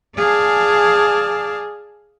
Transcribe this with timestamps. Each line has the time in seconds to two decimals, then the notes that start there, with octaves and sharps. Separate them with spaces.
0.15 G#4 D5 F5 G#5 A5